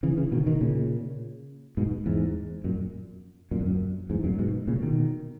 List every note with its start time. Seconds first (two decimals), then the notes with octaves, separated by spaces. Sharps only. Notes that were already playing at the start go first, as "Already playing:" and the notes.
0.03 C#3 E3
0.17 C#3 E3
0.32 B2 D#3
0.47 B2 D#3
0.61 A#2 C#3
1.77 G#2 B2
2.06 E2 G#2
2.64 F#2 A#2
3.51 F#2 A#2
3.61 E2
3.66 F#2
4.10 E2 G#2
4.24 F#2 A#2
4.38 G#2 B2
4.67 A#2 C#3
4.82 B2 D#3